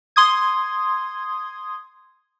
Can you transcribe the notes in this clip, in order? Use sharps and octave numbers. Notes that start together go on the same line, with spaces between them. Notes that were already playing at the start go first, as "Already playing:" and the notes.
C6 D#6 G#6